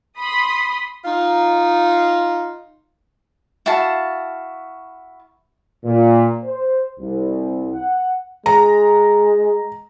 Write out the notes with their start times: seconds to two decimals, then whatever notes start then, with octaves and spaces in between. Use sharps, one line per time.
0.19 B5 C6 D#6
1.05 D#4 F4
3.66 E4 F#4 F5 A5
5.83 A#2
6.43 C5
6.99 C2
7.72 F#5
8.46 G#3 A#5